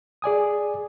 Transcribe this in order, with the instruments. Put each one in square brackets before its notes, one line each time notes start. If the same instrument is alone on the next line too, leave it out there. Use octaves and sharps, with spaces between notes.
[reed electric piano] G#4 D5 G#5 D#6